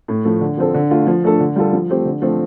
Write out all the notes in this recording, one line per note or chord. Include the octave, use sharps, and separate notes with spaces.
A2
F3 A3
D3
F3 C4 A4
D3
A3 F4
F3
A3 D4 A4
D3
G3 F4 A4
F3
A3 C4 G4
D3
F3 A3 C4